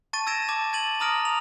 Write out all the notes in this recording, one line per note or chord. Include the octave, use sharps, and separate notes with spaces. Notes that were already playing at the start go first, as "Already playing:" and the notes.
A5 C#6 A6 D#7
E6 G#6 A#6 D7 E7
A5 D6 G#6 A6
G#6 A6 D#7 F#7
A#5 D#6 F6 A#6 D7
F7